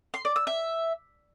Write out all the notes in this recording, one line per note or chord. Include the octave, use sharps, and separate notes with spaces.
C6
D5
E6
E5